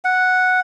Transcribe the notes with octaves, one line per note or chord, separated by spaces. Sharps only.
F#5